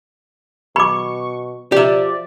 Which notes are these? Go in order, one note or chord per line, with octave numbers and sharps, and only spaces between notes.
B2 B5 C#6 D6
F3 G4 D5 E5